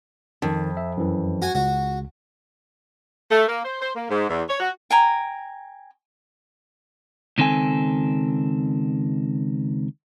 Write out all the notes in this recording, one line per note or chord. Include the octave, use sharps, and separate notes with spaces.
F2 D#3 A5
E5
F#2 E3
F#4 F#5 G#5
C#2 F#4
A3
A#3
C5
C5
A#3
G#2
E2
C#5
F#4
G5 G#5 A#5
C#2 D#3 C4 A4 G#5